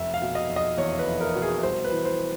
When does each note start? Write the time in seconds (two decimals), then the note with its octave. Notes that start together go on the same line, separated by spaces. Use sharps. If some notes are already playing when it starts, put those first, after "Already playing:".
Already playing: F1 E5
0.14 F5
0.22 B2
0.35 D#5
0.49 F1
0.56 D#5
0.78 E2 C#5
0.99 B4
1.06 F1
1.20 A#4
1.35 B2
1.42 G#4
1.63 C2 C5
1.84 B4
1.92 E3
2.05 C5